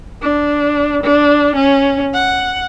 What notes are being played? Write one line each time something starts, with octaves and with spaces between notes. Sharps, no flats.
D4
D4
C#4
F#5